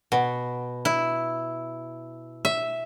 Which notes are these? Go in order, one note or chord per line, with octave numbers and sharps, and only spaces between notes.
B2
E4
E5